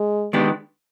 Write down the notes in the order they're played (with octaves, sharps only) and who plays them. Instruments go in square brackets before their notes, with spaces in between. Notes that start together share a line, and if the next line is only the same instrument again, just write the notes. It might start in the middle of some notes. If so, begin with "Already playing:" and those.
Already playing: [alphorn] G#3
[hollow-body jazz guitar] D#3 G#3 B3 D4 G4